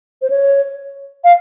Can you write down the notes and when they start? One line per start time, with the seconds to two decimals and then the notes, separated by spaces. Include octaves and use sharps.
0.22 C5
0.30 C#5
1.24 F5